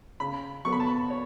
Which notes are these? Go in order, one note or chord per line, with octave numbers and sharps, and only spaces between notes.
C#3 B5
F#3 B3 F#4 A4 C#6
B5
A5
B5
C#5